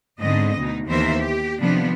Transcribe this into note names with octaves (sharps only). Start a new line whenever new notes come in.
G#2 D3 B3 C4 D#5
D2 B2 D#4
D#2 E3 B3 A#4 C5 E5
G4
C3 D#3 F3 G3 B3 D4